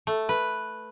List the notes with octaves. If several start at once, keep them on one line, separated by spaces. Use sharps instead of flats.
A3
B4